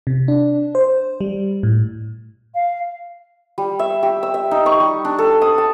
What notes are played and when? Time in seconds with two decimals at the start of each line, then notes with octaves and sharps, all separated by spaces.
0.07 C3
0.28 D4
0.75 C5
1.21 G3
1.63 A2
2.55 F5
3.58 G3
3.79 E5
4.03 G4
4.23 E6
4.34 E5
4.51 D#4
4.66 C#6
4.80 G3
5.05 D4
5.19 A4
5.42 D#6
5.58 A5